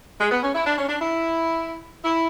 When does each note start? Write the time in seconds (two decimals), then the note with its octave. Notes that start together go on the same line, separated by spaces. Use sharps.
0.20 G#3
0.32 B3
0.43 C#4
0.55 E4
0.66 D4
0.78 C#4
0.89 D4
1.01 E4
2.05 E4